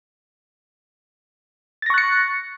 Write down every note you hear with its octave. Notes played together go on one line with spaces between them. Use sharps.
C#6 F#6 A6 A#6 C#7